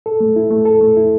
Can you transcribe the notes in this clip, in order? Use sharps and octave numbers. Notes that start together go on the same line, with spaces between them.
A4
A3
E4
A3
A4
A3
E4